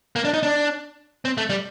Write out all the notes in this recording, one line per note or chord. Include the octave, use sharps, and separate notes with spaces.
A#3
D4
D#4
D4
C4
A3
G3